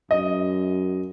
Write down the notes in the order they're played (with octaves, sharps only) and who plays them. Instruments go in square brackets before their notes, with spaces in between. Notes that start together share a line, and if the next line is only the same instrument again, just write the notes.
[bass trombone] F#2 [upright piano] D#5